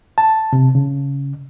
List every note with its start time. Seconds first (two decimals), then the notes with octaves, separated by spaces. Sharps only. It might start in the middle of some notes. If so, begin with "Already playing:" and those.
0.18 A5
0.53 C3
0.75 C#3